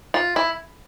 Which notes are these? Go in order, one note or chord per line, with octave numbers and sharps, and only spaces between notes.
F4
E4